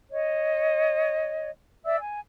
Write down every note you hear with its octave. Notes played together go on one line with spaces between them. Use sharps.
C#5 D#5
D5 E5 E6
G#5